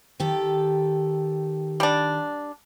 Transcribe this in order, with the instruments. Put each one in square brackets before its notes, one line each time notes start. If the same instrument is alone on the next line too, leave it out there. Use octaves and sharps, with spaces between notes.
[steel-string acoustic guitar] D#3 G4 A4
[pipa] G3 D4